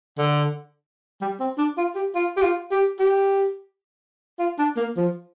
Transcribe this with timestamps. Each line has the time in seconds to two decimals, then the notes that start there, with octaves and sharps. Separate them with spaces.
0.18 D3
1.21 G3
1.40 C4
1.58 D4
1.77 F4
1.95 G4
2.15 F4
2.37 G4
2.42 F4
2.71 G4
2.99 G4
4.39 F4
4.59 D4
4.77 A#3
4.96 F3